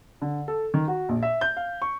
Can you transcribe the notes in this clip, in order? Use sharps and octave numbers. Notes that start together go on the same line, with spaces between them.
D3
A4
D#3
F#4
A#1
E5
G6
F5
C#6